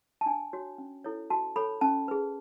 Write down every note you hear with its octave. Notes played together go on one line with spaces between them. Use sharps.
A5
D4 G#5
F#4 C#5
C#4
E4 A4 C#5
F#4 A5
A4 C#5 B5
C#4 A5
G#4 B4